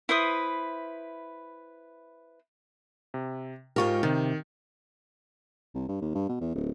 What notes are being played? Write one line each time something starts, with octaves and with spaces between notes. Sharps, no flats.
E4 B4 C5 D#6
C3
G#2 F4 G4 A#4 C#6
C3 D#3
C2
G2
D#2
G2
B2
E2
D1